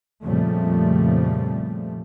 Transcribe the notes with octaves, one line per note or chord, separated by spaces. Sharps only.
F2 A#2 C#3 F3 G3 A3